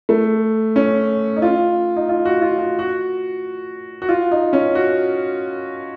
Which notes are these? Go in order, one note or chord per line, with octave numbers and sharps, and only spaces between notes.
A3
C#4
D#4
F4
D#4
F4
F#4
F4
F#4
F#4
F#4
F4
D#4
C#4
F#4